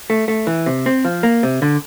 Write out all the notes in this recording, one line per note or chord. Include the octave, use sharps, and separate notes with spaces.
A3
A3
E3
C3
C4
F3
A#3
C3
D3